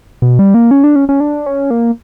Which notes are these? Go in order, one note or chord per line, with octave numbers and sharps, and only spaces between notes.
B2
G3
A#3
C#4
D4
C#4
C#4
D4
C#4
A#3